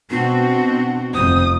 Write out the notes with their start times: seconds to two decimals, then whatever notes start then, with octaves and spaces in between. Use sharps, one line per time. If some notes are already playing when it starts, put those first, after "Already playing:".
0.10 B2 C4 D4 F#4
1.14 F1 F2 C4 C5 D#6